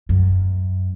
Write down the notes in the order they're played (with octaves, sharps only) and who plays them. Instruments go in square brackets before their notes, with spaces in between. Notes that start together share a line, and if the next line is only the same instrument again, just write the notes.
[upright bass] F#2